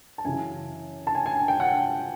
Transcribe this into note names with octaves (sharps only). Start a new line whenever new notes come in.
A5
F#2 C#3 E3 G#5
A5
G#5
G#5
G5
F#5